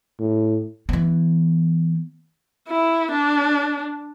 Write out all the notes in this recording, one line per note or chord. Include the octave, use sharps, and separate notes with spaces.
A2
E3 B3
E4
D4